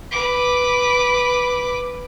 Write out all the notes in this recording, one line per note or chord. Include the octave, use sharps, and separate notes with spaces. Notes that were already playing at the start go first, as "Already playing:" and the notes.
B4 D6